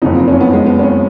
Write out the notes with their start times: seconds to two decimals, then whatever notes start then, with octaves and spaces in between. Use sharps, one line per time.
0.02 F#1 F2 C#3 D#4
0.15 F4
0.28 C#4
0.41 B3
0.53 G#3
0.66 B3
0.79 C#4